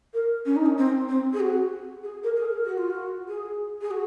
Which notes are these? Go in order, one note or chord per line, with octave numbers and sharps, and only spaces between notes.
A#4
C#4
D#4
C#4
C4
C4
G#4
F#4
G#4
A#4
G#4
A#4
F#4
F4
F#4
G#4
G#4
F#4